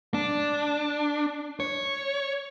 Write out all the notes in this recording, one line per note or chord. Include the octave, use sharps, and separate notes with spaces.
D4
C#5